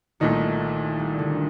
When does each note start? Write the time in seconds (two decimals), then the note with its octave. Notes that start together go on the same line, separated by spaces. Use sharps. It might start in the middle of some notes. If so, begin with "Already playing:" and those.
0.20 C2 A#2 D#3 A3 D#4
0.99 G3
1.19 D3